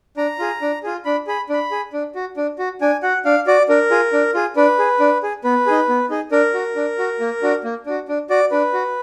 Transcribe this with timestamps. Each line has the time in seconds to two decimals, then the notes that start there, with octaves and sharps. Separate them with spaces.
0.17 D4 A#5
0.39 F4 G#4
0.62 D4
0.83 F4 G#4
1.05 D4 B5
1.27 G#4 B5
1.49 D4 B5
1.71 G#4
1.93 D4
2.15 F#4
2.37 D4
2.59 F#4
2.81 D4 G#5
3.03 F#4 F#5
3.25 D4 F5
3.47 F#4 D5
3.69 D4 A#4
3.90 F4 G#4
4.13 D4
4.34 F4 G#4
4.56 D4 B4
4.79 G#4
5.00 D4
5.23 G#4
5.44 B3 B4
5.66 D#4 G#4
5.89 B3
6.10 D#4 G#4
6.32 D4 A#4
6.54 F#4
6.76 D4
6.99 F#4
7.20 A#3
7.43 D4 F#4
7.64 A#3
7.86 D4 F#4
8.08 D4
8.30 F#4 D5
8.51 D4 B4
8.73 F#4